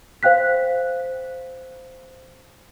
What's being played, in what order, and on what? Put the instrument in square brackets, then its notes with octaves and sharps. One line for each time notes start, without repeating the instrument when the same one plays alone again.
[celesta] C5 F5 G5 F#6 B6